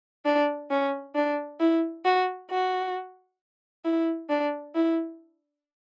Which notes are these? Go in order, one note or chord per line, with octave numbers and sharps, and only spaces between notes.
D4
C#4
D4
E4
F#4
F#4
E4
D4
E4